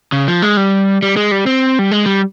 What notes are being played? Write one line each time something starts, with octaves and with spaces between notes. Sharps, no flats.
C#3
F3
G#3
G3
G3
G#3
G3
C4
G3
G#3
G3